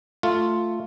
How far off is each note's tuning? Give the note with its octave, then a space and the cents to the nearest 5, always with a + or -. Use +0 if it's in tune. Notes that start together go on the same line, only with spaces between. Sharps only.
A3 +10 F4 +0